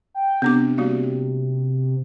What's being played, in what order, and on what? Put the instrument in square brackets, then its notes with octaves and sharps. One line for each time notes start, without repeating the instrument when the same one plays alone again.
[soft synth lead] G5
[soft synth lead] C3 [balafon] B3 D4 D6
[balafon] G3 A#3 F#4